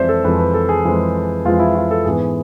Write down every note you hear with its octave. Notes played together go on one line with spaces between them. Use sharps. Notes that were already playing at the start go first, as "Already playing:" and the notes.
Already playing: F2 E3 G#3 C4 C5 D5 E5
A4
F2 E3 G#3 C4 B4
B4
A4
G#4
F2 E3 G#3 C4
F2 E3 G#3 C4 F4
E4
F4
A4
G#2 E3 B3 G#4